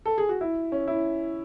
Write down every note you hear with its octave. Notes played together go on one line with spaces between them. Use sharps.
A4
G#4
F#4
E4
C#4
E4